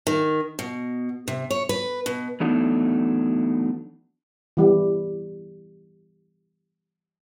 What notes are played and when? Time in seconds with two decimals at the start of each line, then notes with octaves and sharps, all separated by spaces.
0.07 D#3
0.59 B2
1.28 C3
1.51 C#5
1.69 B4
2.06 B2
2.40 E3 F#3 A3 B3 D4 D#4
4.57 E3 G3